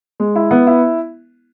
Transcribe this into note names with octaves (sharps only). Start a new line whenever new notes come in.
G#3
E4
B3
E4